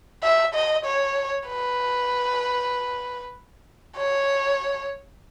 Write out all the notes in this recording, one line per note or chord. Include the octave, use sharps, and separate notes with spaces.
E5
D#5
C#5
B4
C#5